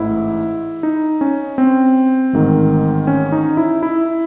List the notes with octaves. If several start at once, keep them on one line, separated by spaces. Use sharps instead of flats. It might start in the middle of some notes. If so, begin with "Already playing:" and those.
Already playing: A1 G#2 E3 A3 E4
D#4
C#4
C4
A1 G#2 D#3
C#4
D#4
E4
E4